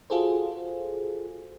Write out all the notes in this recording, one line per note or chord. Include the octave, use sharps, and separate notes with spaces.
F4 F#4 G#4 A4 C5